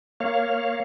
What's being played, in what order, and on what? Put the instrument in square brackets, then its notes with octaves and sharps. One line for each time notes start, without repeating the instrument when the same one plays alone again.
[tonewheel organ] A#3 C#5 F5